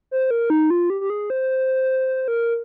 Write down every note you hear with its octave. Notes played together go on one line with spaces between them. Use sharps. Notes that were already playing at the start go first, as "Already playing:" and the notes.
C5
A#4
D#4
F4
G4
G4
G#4
C5
A#4